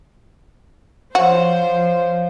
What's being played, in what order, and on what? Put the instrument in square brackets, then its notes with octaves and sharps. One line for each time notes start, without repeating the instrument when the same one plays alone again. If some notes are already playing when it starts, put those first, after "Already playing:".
[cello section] F3 [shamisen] F#4 [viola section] C5 [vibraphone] C#5 F5